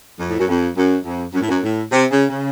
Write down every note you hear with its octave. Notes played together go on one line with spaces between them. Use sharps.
F2
A2
F#2
F2
F#2
F2
F#2
A2
F#2
A2
C3
C#3
C#3